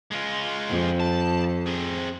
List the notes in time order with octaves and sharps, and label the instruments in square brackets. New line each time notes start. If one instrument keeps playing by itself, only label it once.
[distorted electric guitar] G#3 F4
[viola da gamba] F2
[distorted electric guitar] A5
C4 G#4